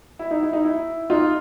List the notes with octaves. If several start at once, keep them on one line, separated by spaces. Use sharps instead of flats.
E4
D#4
E4
D#4
E4
D#4 F4